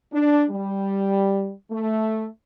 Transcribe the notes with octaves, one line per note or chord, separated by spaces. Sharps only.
D4
G3
A3